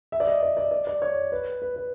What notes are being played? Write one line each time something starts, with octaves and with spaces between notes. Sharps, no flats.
E5
D5
D#5
D5
D5
D5
D5
C#5
B4
B4
B4